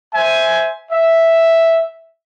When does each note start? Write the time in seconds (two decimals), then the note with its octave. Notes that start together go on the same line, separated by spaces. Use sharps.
0.15 C5 E5 G#5
0.92 E5